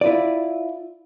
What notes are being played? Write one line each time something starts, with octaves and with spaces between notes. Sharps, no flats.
E4 F4 D5